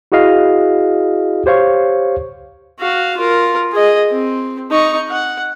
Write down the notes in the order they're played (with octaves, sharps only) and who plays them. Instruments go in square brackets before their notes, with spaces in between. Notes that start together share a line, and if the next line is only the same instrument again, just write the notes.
[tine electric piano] E4 F#4 G#4 D#5 F5
G4 C5 C#5 F5 C#6
[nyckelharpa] F#4 F5
F4 A#4
G#4 D#5
C4
D#4 C#6
F#5